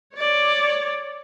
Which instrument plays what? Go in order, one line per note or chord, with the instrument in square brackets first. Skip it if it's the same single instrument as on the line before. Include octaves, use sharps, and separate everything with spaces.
[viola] C#5 D5